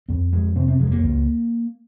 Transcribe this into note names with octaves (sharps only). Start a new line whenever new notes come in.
F2 C4
F2 G#3
C3 C4
C4
F2 G#3
A#3
C#2